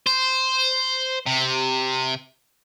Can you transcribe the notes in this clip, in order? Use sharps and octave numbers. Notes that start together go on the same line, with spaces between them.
C5
C3